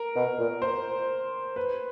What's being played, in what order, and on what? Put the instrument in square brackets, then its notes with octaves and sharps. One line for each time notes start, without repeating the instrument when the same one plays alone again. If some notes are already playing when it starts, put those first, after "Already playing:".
Already playing: [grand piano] A#4
[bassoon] B2
A#2
[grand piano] C5
B4